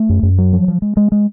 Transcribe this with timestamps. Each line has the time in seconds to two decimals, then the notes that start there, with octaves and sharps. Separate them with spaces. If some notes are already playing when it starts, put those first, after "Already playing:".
Already playing: A3
0.09 F#2
0.23 F#2
0.38 F#3
0.53 F3
0.68 F3
0.82 G#3
0.97 G#3
1.12 G#3